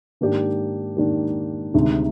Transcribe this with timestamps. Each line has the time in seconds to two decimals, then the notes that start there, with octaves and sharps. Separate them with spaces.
0.21 G#2 D#3 A#3 D4 G4
0.97 G#2 D#3 A#3 D4 G4
1.74 D2 C3 D#3 G#3 D#4